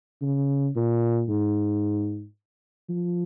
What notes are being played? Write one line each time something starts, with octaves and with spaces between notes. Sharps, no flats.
C#3
A#2
G#2
F3